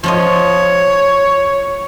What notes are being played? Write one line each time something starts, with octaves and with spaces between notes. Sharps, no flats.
F3 F4 C#5 D#5